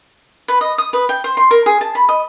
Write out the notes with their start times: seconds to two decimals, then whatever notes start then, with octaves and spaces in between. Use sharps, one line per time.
0.48 B4
0.61 D#5
0.78 D#6
0.93 B4
1.09 G5
1.24 C5
1.37 C6
1.51 A#4
1.66 G#4
1.81 A5
1.95 B5
2.09 D#5